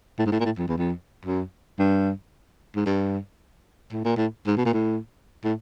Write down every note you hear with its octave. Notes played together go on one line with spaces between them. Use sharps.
A2
G#2
A2
A#2
A2
F2
E2
F2
F#2
G2
G#2
G2
A2
A#2
A2
G#2
B2
A#2
A2
A2